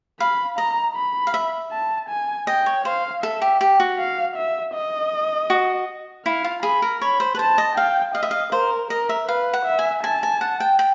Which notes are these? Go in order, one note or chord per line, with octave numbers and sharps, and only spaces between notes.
F5 B5
D#5 A#5
B5
F5
E5
A5
G#5
D#5 G5
C#5
C5 F5
A4 E5
G4
G4
F#4
F5
E5
D#5
F#4
E4 F5
F4
G#4 B5
A#4
C#5 B5
C5
B4
C5 A5
D#5
F5 G5
D#5 F5
E5
F5
A#4 C5
A#4 D#5
E5
B4 F5
F#5
E5
G#5
G#5 A5
G#5
F#5
G5
G5